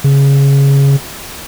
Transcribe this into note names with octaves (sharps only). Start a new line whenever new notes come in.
C#3